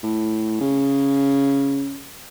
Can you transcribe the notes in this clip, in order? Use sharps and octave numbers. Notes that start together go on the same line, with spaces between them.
A2
C#3